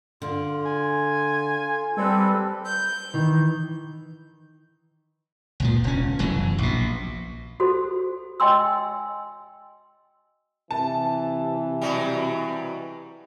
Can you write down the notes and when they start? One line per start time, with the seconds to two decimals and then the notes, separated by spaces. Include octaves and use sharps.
0.22 D3 F4
0.66 G#5
1.97 G3 C4 A4 B4
2.64 G6
3.14 D#3 E3
5.60 C#2 A#2 F3
5.84 E1 C#4
6.19 F1 F#2 E3 F#3
6.58 A#1 B2
7.60 F#4 A4 C5
8.40 D#5 G5 G#5 C6 E6
10.71 C3 E3 A5
11.81 B2 F#3 G3